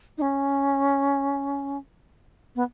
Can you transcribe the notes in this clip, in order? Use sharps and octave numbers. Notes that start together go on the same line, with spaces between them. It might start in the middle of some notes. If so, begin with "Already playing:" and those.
D#4
C#4
B3